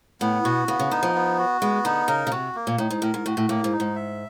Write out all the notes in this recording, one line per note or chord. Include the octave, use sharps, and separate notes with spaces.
A2 B3
B2 F#4
C#3 B3
C#3
D3 D#4
F3
B3
F#4
G#3 B3
D3 D#4
C#3 A#4
C#3
C3 F#4
A#3
A#2
A2 D#4
G#2
A2 A#4
G#2
A2 F#4
A2
A2 A#3
G#2
D#4
G#2
E5